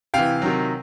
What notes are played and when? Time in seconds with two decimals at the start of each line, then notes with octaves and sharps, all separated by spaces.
0.14 C3 E3 F5 G5
0.42 C3 D#3 F#3